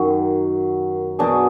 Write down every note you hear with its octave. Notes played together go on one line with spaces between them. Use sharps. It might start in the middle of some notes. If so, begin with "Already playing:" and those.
Already playing: F#2 D#3 F#3
B2 F#3 D4 G#4